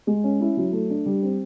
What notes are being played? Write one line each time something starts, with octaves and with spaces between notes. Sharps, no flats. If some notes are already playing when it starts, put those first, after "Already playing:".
G#3
C#4
E4
F#3
A3
D4
G3
C4